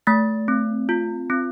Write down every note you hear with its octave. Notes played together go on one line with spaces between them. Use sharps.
A3 A6
C4
F4
C4